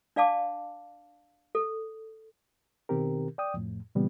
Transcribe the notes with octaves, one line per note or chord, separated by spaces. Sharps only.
D4 D5 F5 A5 D6
A4
B2 D#3 C4 G4 A#4
D5 G5 D#6
F2 A2
A#2 C#3 E3 G3 B3